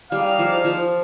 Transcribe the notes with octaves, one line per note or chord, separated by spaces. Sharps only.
G3 D#4 G#4 D5 F5
F3
F3